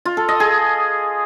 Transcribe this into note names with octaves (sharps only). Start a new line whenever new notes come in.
F4
A4
D#5
G#4